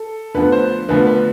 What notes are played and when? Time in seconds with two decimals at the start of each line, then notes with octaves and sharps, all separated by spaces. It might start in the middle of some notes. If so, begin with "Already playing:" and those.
Already playing: A4
0.35 D2 D3 F3 B3 B4
0.52 C5
0.89 D2 D3 F3 B3 B4
1.07 B4